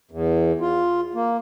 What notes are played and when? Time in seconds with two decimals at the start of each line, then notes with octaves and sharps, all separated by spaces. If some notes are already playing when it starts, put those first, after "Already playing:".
0.11 E2
0.61 F4
1.14 A#3